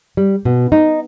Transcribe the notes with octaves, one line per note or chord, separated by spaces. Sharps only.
G3
B2
D#4